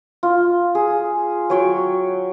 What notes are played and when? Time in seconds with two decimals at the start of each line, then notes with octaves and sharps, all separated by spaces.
0.23 F4
0.75 G#4
1.50 F#3 C#5 G5